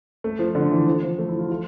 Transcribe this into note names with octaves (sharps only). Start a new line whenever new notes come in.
A3
F3
D3
E3
F3
F3
A3
E4
F4
F4